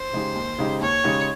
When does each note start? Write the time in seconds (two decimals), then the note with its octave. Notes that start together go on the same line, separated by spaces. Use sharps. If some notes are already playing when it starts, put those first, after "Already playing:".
Already playing: C5
0.13 C#3 G#3 D#4 G4
0.35 D#2
0.58 C#3 G#3 D#4 G4
0.81 D#2 C#5
1.04 C#3 G#3 D#4 G4